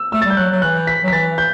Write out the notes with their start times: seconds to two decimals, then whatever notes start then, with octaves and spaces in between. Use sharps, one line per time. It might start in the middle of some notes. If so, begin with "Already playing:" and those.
Already playing: E6
0.12 A3 E6
0.22 A6
0.25 G3
0.30 G6
0.37 F#3 F#6
0.51 F#3
0.62 E3 F#6
0.87 B6
1.03 F#3
1.08 B6
1.12 E3 A6
1.38 G6